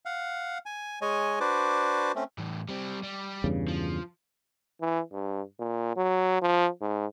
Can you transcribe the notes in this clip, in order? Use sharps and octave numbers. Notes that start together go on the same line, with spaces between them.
F5 F#5
G#5
G#3 C#5 D#5 G#5
D4 F#4 B4 C5 D5 D6
A3 C4 C#4
E2 A2
G3 C4
G3
E2 G2 C#3
F3
E3
G2
A#2
F#3
F3
G#2